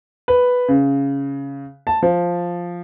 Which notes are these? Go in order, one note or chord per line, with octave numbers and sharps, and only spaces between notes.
B4
C#3
A5
F3